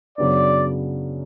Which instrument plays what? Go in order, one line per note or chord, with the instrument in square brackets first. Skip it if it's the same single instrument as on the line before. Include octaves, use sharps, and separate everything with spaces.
[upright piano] F#2 C#3 F#3 B3 D4 [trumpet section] D5